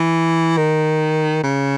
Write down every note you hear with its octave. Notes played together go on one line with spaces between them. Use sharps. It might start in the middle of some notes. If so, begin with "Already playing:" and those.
Already playing: E3
D#3
C#3